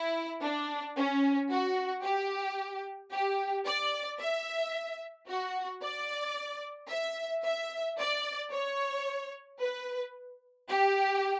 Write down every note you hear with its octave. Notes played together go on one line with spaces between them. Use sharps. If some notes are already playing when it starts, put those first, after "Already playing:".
Already playing: E4
D4
C#4
F#4
G4
G4
D5
E5
F#4
D5
E5
E5
D5
C#5
B4
G4